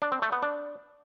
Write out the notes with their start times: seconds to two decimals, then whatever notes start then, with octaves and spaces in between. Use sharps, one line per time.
0.02 D4
0.12 C4
0.22 A3
0.32 B3
0.43 D4